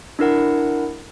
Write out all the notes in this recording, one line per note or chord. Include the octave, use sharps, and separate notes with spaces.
D4 E4 A#4 F#5